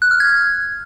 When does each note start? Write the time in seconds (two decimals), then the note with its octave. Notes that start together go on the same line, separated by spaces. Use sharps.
0.02 F#6
0.11 F6
0.20 G#6